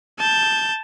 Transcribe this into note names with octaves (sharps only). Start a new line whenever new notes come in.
A5 G6